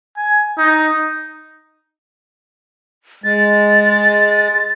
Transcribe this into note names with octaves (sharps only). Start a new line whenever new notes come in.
G#5
D#4
G#3 A6